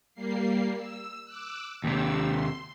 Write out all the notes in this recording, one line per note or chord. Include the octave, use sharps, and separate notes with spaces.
G3 A#3 C7
E6
D6 E6 F#6
D#2 C3 E6
C6